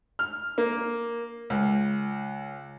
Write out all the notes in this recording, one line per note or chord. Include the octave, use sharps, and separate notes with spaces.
F6
A#3
C#2